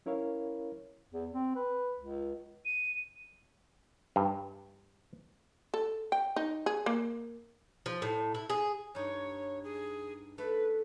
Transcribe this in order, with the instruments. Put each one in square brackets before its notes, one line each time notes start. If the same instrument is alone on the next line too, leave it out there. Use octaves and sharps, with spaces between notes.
[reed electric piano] C#4 E4 A#4 C#5 F5
[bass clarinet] E2
C4
B4
C#2
[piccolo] D#7
[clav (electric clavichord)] G2
[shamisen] A4
G5
D#4
G#4
A#3
[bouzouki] F3
A2
E4
G#4
[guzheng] G2 D#4 [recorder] C#5
[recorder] G#4
[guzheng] A3 [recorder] B4